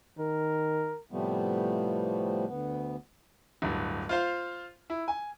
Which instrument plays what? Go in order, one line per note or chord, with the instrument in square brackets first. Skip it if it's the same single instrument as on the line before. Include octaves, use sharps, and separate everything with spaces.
[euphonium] D#3 [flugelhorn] A#4
[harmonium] A2 C3 F3 G3 A3 B3
D2 B3
[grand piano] D1 G2
F4 C5 F5
E4
G#5